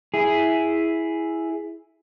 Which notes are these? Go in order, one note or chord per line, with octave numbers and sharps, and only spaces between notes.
E4 G#4